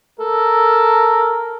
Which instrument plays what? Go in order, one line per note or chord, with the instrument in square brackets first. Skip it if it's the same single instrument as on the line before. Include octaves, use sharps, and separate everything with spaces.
[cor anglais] A4 [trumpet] A#4